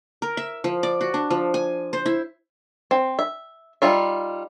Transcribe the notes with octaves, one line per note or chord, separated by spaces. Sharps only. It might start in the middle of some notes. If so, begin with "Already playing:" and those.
A#4
E5
F3
D5
F#4
D4
F3
G#5
C5
E4
C4
E5
G3 D#4 F4 E5